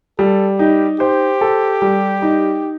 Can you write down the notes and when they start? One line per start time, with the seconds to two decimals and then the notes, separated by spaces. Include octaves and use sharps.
0.19 G3 A4
0.59 D#4 G4
1.00 G4 C5
1.41 A4
1.82 G3
2.22 D#4